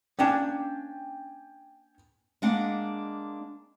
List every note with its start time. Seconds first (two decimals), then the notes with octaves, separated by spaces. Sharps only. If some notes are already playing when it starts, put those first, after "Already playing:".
0.19 A#3 C#4 D4 G5 G#5
2.42 G#3 A#3 D4 D#5 F#5